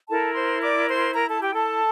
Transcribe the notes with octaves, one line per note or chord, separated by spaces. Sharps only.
E4 A4 A#4 A5
C5 C6
D5 D6
C5 C6
A#4 A#5
A4 A5
G4 G5
A4 A5